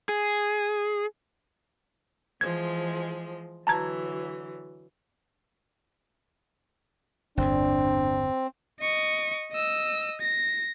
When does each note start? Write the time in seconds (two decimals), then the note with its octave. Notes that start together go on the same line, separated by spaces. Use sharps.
0.09 G#4
2.41 E3 F3 G#3 G#6
3.67 D3 E3 F#3 A5 A#5 G#6
7.37 G1 E2 A2 C4 D4
8.80 D#5 C#6
9.52 D#5 E6
10.21 A#6